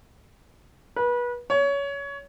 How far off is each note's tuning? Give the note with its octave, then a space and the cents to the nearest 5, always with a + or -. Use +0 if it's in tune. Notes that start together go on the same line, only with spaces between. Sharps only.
B4 -30
C#5 +20